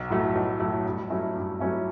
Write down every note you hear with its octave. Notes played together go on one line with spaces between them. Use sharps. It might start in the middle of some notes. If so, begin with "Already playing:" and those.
Already playing: B1
A2 F#3 A3
B1
A2 F#3 A3
G2
F#3 A3 C#4 E4
G2
F#3 A3 C#4 E4